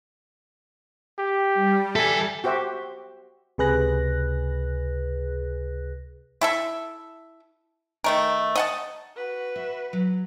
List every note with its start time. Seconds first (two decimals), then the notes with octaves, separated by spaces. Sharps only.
1.19 G4
1.55 G3
1.96 A4 E5 G#5
2.44 F#4 G4 C5 E5
3.58 C#2 C3 G#4 B4 F#6 A#6
6.41 E4 A4 E5
8.04 D#3 A3 A#4
8.56 D#5 F#5 A5
9.16 F#4 B4
9.56 E5
9.93 F#3